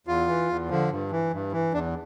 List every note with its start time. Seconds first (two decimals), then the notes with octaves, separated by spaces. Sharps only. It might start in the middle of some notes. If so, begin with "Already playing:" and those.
0.07 E2 F4
0.28 E3
0.49 E2
0.69 D3 F3
0.91 G2
1.11 E3
1.32 G2
1.52 E3
1.73 E2 D4